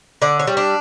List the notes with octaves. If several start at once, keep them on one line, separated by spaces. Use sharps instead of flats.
D3 D5
C#5
G3
D4